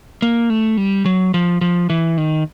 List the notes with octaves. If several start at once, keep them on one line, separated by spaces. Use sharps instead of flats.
A#3
A3
G3
F#3
F3
F3
E3
D#3